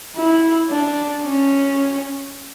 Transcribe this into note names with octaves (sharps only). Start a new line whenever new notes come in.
E4
D4
C#4